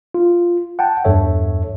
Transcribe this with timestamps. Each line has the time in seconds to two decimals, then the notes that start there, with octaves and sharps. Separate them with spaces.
0.14 F4
0.79 F#5 G5 A5
1.04 E2 G2 A4 C#5 E5